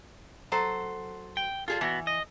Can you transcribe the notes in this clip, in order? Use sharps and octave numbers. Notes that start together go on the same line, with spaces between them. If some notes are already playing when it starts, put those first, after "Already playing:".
F#3 A4 C5
G5
G3 F4 G#4 A4
E3 B3 F#4
D#5